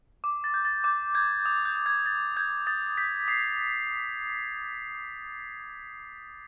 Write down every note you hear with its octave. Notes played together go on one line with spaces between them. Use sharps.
D6
A6
G6
A6
D6 G6
G6 G#6
D#6
G6
G6
G#6
D#6 A6
G6 G#6
D#6 A6
G6 B6
D#6 C7